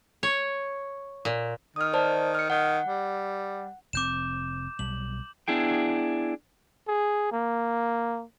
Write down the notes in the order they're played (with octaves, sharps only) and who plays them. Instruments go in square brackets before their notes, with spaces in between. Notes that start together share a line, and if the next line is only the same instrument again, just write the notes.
[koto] C#5
A#2
[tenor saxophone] D#3 [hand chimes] D#6 F6
[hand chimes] C5 D5 A5
F6 C#7
[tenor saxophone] D#3 [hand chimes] F#5
[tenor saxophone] G3
[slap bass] F1 C3 C4 [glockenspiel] D6 G6 E7
[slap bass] B1 G3 [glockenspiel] F#7
[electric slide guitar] B3 D4 E4 G#4 G5
[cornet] G#4
A#3